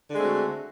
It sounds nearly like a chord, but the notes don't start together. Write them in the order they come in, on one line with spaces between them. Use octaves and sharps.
D3 G#3 A3 C4 F#4